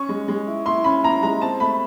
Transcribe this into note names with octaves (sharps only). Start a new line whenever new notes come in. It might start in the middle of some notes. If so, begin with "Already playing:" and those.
Already playing: C#4 C#6
G#3
G#3
E4
E4 C6
C#4 B5
E4 A#5
G#3 A#5
C4 A5
A3 B5